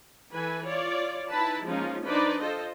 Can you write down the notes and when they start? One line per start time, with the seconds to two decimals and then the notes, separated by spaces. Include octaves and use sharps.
0.32 E3 A4 B4 G#5
0.65 F4 C#5 D5
1.31 D#4 E4 B4 A5 B5
1.66 F3 G#3 A#3 C#4 D#4 F4
2.06 D4 D#4 B4 C5 D5
2.41 F4 A4 C5 D#5